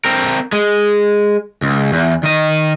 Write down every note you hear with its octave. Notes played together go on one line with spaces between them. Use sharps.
C4 A#4
G#3
C#2
E2
D#3 D#5